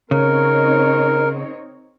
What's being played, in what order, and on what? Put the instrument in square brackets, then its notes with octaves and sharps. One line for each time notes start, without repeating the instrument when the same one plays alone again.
[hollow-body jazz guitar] C#3 [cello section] C4 D#4 C#5 [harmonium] A#4